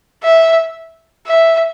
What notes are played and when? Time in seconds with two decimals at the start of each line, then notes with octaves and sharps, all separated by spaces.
0.24 E5
1.27 E5